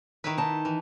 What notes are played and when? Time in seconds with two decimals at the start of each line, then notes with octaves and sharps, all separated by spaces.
0.24 D#3 E4 B4
0.38 D#4 A5
0.65 E3